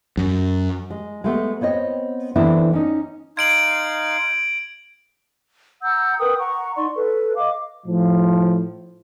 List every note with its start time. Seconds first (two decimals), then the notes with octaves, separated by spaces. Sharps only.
0.17 F#2
0.90 G#3
1.24 G#3 A3 B3
1.61 B3 C4 C#5 D#5
2.36 D3 E3 B3 C4 D4 E4
2.73 C#4 D#4
3.37 D#4 F5 C6 G#6 D7 F#7
5.83 F#5 A#5 E6 G6
6.19 A#4 B4 G5 D#6
6.39 F#5 A#5 C#6
6.76 D#4 D5 C6 C#6
6.94 A4 B4
7.36 D#5 F5 D6
7.87 A2 F3